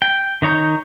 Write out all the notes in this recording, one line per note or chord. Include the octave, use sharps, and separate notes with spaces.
G5
D#3 D#4 C#5 A#5 G6